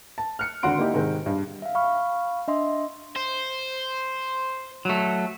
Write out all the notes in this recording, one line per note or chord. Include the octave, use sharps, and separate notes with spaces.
A5
F6 F#6 C#7
G#1 D3 F#4 F#5 C6 D7
A#3 D#4 E4 G4
G#2 C3 D#3 G#3 C4
G2
E5 F5
F5 B5 C#6 F6
D4 D#5 E5 C6
C5
F#3 A3